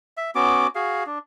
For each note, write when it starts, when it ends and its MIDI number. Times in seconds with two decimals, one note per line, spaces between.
0.17 0.31 76
0.35 0.67 59
0.35 0.67 61
0.35 0.67 66
0.35 0.67 86
0.75 1.04 66
0.75 1.04 68
0.75 1.04 77
1.06 1.19 62